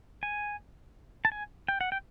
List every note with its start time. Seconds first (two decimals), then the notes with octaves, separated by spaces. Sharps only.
0.23 G#5
1.25 A5
1.32 G#5
1.68 G5
1.81 F#5
1.92 G5